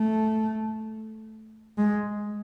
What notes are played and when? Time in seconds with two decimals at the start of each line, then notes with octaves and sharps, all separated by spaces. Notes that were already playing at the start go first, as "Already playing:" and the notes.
Already playing: A3
1.78 G#3